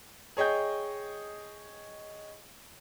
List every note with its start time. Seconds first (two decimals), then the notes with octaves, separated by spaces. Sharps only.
0.37 G#4 C#5 D#5 G5 G6